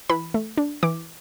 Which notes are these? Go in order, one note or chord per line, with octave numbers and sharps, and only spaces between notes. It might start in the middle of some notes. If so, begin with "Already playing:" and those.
E3 B5
A3
D4
E3 D6